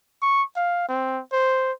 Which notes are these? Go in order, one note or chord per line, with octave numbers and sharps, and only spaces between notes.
C#6
F5
C4
C5